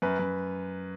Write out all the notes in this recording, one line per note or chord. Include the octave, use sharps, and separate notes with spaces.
F#2 B4
F#2